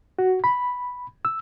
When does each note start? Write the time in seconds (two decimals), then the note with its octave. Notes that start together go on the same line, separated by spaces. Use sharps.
0.19 F#4
0.44 B5
1.25 E6